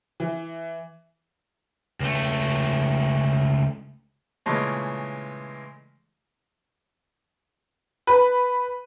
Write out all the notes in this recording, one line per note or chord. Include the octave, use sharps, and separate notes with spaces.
E3
C#2 A3
A#2 C#3 E3 G#3 A3
B4